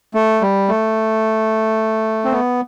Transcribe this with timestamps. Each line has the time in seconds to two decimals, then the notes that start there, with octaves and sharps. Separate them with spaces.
0.14 A3
0.42 G3
0.69 A3
2.24 C4
2.32 B3